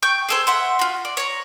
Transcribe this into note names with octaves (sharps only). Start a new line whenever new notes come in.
G5 C#6 G6
G#4 A4 C5
E5 F#5 C6
F4 F#4
D5
C#5 A#5